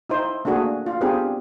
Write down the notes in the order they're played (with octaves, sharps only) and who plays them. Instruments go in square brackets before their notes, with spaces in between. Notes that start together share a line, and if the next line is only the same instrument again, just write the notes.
[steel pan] D#4 E4 C5
A3 A#3 D4 F#4 G#4
F4
B3 C4 D4 F4 G4 G#4